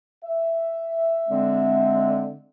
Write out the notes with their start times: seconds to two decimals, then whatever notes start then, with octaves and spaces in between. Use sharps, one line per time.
0.25 E5
1.29 D3 G#3 C4